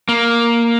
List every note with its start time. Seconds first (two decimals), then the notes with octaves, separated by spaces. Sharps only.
0.09 A#3